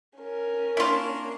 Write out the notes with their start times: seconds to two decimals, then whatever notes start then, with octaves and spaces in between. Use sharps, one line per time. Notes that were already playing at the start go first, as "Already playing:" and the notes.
0.18 C#4 A#4
0.77 A#3 D4 E4 F4 C#6